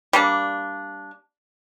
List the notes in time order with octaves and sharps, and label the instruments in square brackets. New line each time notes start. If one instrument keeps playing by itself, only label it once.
[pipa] G3 A#3 D4